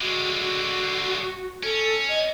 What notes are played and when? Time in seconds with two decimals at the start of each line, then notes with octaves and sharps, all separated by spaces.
0.01 D3 G#3 F#4
0.39 F#4
1.63 C#4 A4
2.09 D#5